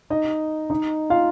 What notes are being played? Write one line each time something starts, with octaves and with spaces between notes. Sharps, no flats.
D#4 D#5
D#4 D#5
F4 F5